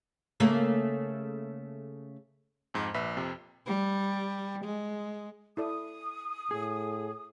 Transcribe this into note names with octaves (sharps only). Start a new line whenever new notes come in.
C#3 A3 A#3
F2 G#2
A#1 B4 E5 B6
F2 C3
G3
G#3
E4 A4 D5 D#6
A2 G#4